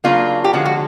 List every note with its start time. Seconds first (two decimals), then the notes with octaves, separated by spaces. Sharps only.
0.04 C#3 F#3 A#3 D4 F4
0.44 G4
0.53 D3 F3 G#3 C#4 F#4
0.65 F#4